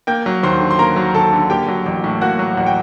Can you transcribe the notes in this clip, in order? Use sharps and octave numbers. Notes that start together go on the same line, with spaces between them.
A#3 G5 G6
F#3
D#2 C5 C6
D3
C6
A#3 A#4 A#5
F#3
D#2 A4 A5
D3
A#3 G4 G5
F#3
A1
A2
A#3 F#4 F#5
F#3
A1 F#5
G5